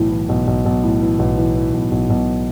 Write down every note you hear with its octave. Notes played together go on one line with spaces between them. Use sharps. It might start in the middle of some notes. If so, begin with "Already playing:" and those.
Already playing: B1 A2 E3
E3
B1
B1
B1
A2
E3
B1
E3
E3
B1
B1
B1